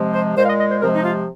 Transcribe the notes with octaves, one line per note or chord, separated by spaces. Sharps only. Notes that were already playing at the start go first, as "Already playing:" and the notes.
Already playing: C3 F3 G#3
C5
A#2 G#3 C5
F5
D#5
D#5
C5
C3 F3 G#3 A#4
D#4
F4